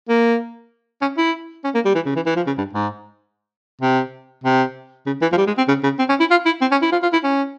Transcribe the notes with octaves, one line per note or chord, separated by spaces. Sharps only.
A#3
C#4
E4
C#4
A#3
G3
E3
C#3
E3
E3
F3
C#3
G2
G#2
C3
C3
C#3
E3
F3
G3
G#3
C4
C#3
C#3
C4
C#4
E4
F4
E4
C4
C#4
E4
F4
F4
E4
C#4